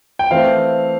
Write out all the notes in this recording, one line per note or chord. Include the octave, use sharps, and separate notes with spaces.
G5
E3 A3 C4 F5